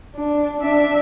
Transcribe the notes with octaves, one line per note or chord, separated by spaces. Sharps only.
D4
D4 E5